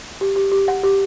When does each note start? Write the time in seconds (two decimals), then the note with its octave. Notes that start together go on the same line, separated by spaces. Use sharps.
0.21 G4
0.36 G4
0.52 G4
0.68 F#5
0.83 G4